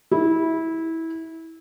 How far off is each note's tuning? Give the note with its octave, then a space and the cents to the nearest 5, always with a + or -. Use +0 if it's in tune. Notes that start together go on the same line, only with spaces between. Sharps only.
E4 -20